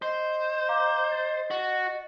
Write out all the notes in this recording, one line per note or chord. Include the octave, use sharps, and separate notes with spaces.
C5 D#5
F5 A#5 D6
A6
F#4